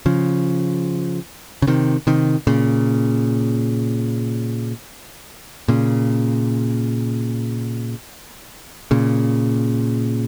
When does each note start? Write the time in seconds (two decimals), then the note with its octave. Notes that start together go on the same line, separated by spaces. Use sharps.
0.06 C#3 F3
1.62 C#3
1.67 C3 D#3
2.07 C3 D#3
2.47 A#2 C#3
5.68 A#2 C#3
8.91 A#2 C#3